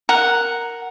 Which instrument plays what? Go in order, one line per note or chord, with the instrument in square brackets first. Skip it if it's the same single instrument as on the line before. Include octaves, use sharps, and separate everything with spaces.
[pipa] A#4 [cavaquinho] F#5